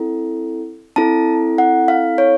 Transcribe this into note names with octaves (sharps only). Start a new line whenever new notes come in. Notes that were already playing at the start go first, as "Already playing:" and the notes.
Already playing: C4 E4 A4
C4 E4 A4 A5
F#5
F5
C#5